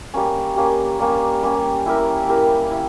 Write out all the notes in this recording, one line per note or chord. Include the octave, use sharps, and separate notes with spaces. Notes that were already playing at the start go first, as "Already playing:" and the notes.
G3 A#3 C#4
G3 A#3 C#4
G3 A#3 C#4
G3 A#3 C#4
E4 G4 A#4
E4 G4 A#4
E4